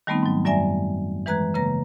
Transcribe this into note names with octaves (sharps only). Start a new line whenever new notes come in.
D#3 G3 A3 B3 C4 D#4
G#2 F#3
F#2 G3 D5 E5 G#5 A#6
E3 G#3 B4 A#5 F#6 G#6
C#3 A#3 B4 A#5 A#6